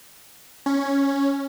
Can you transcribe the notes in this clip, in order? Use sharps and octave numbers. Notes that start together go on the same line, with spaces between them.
C#4